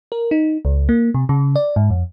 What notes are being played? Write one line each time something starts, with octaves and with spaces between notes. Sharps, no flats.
A#4
D#4
C#2
A#3
C3
C#3
D5
G#2
F2